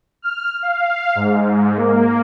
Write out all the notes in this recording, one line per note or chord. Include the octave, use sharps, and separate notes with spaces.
F6
F5
G#2
A#3